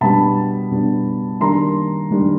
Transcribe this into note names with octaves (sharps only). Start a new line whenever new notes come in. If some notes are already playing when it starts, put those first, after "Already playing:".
B2 G3 B3 D4 A5 B5
B2 G3 B3 D4
D#3 G3 A#3 D4 A#5 C6
D#3 G3 A#3 D4